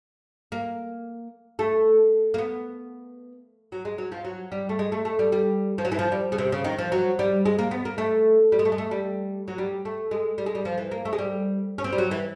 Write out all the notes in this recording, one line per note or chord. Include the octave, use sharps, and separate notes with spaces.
A#3
A3
A#3
B3
F#3
G#3
F#3
F3
F#3
G3
A3
G#3
A3
A3
G3
G3
F3
F#3
E3
F3
G3
C#3
C3
C#3
D#3
F3
F#3
G3
G#3
A#3
B3
A#3
A3
G3
G#3
A3
G#3
A3
G3
F#3
G3
A3
G#3
G3
G#3
G3
F3
E3
A#3
A3
G#3
G3
C#4
C4
G3
F#3
E3